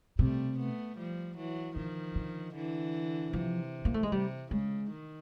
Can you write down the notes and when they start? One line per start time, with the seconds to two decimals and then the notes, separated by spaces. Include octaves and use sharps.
0.19 C3 G3 A3
0.58 A3 B3
0.98 F3 G3
1.37 E3 F#3
1.76 D3 D#3 F3
2.15 D3
2.54 D3 E3
3.33 C3 F3
3.85 A#3
3.94 A3
4.03 G#3
4.12 C3 G3
4.51 C#3 G#3
4.90 D#3